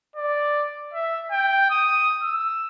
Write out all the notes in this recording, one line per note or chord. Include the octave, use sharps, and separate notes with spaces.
D5
E5
G5
D#6
E6